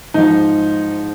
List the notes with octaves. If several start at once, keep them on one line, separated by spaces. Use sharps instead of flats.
G#2 F3 D#4